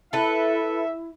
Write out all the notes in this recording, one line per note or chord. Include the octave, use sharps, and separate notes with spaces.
E4 A4 B4 E5